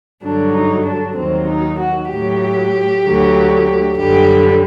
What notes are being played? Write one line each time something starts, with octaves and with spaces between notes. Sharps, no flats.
G2 D3 F#3 D4
D#4
D4
D#2 D#3 F#3 C4
D#4
F#4
A2 F#3 G4
D2 D3 F#3
F#2 D3 G3 G4